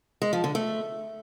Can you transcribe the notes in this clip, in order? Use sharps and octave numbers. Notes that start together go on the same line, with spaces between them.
G#3
F3
D3
A3